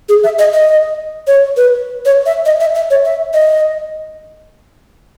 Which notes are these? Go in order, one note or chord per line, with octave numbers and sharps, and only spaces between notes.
G#4
E5
D#5
D#5
C#5
B4
C#5
E5
D#5
E5
E5
C#5
E5
D#5